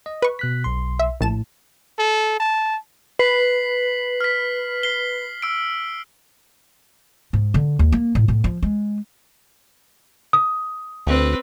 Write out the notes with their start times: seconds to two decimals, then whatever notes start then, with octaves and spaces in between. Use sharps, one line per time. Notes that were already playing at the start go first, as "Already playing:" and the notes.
0.06 D#5
0.22 B4 C#6
0.39 B2 F#6 B6
0.64 B1 C6
0.99 E5
1.21 A#1 A2 A5 E7
1.99 A4
2.40 A5
3.19 B4 B6 C7 F#7
4.21 F6 B6
4.83 C7 G7
5.42 E6 D7
7.33 G#2
7.54 D3
7.79 D#2
7.92 A#3
8.15 A2
8.28 A2
8.44 F3
8.63 G#3
10.33 D#6
11.07 D2 C4 B4